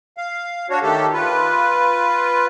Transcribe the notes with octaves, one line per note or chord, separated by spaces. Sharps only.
F5
D4 F#4 C#5
D#3 A3 G4 A4
F4 B4